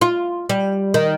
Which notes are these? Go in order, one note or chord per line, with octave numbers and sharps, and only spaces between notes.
F4
G3
D#3